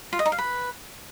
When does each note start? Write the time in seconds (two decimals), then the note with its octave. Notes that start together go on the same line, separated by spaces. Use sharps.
0.13 F4
0.19 D#5
0.26 D#4
0.32 F5
0.38 B4